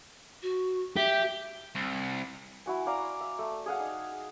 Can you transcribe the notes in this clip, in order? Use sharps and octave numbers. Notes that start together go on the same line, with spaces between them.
F#4
G4 E5
C2
E4 F#4 G#5
D5 F5 A#5
E5
A3
G#4 F5 F#5
D#4